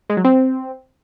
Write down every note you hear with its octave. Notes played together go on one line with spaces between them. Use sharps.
G#3
F#3
C4